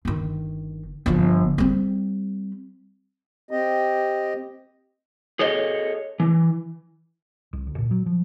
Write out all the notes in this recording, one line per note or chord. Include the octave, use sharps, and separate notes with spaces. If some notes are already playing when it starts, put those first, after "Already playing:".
G1 D#3
G1 F3
G3 C4
C4 G4 D#5
G#4 A4 C#5 D#5
E3
C2
D2
A#2
F#3
F3